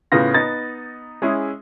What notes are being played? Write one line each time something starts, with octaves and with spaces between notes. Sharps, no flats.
A2 C#3 B3 F4 A#6
B3 D#4 A6
G#3 C#4 E4 G#4